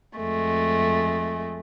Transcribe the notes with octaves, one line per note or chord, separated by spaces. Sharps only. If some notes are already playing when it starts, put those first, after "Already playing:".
F2 G#3 A3